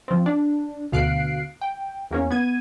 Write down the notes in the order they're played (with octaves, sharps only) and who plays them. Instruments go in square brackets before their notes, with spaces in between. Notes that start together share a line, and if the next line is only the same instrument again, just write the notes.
[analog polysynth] F3 C4
D4
D2 B2 F5 F#6 C7 D7
G5
E2 A#3 C#4
B3 G#6 D#7